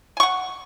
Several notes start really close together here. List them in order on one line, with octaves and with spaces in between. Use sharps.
G#5 C#6 F#5